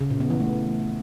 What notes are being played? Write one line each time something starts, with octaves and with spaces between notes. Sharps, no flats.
C#3
A#2
B3
E3
A3